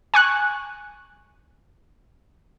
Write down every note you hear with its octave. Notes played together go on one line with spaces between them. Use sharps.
G#5 C#6 F#6